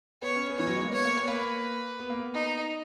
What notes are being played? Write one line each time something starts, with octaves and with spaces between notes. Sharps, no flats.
B3 C#5
C#4
B3
E3 C#5
F#3
G#3
A#3
B3 C#5
A#3
B3
A#3 B4
B3
A#3
B3
D#4